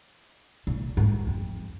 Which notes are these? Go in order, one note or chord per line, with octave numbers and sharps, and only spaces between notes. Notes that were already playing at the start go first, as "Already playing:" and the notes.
A#2
G#2
F2